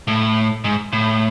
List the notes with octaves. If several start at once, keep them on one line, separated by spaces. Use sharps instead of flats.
A2
G#2
A2